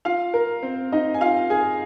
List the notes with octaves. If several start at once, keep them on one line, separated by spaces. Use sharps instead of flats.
F4 F5
A#4
C4 C5
D#4 D#5
G#5
F4 F5
G#4 G#5